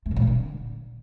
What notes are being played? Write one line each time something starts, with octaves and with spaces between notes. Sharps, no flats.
A3
C3
A#2
F3
D3